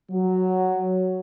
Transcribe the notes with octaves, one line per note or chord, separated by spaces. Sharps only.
F#3